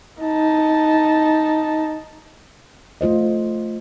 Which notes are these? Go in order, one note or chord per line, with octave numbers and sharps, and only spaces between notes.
D#4 A5
A3 F4 C5 D#5